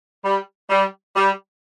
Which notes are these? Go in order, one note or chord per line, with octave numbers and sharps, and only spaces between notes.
G3
G3
G3